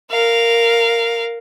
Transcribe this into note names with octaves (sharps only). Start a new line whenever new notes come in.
A#4 F5